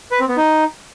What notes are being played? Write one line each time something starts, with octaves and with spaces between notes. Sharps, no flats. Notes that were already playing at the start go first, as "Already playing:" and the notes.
B4
C4
B3
D#4